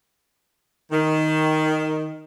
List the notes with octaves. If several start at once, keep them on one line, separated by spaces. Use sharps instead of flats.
D#3